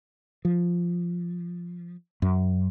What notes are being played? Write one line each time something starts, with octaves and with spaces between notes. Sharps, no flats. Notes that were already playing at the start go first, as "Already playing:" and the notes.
F3
F#2